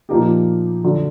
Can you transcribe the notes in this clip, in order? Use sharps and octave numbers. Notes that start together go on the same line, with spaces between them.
A#2 F3 A#3 D#4 G4
D3 F#3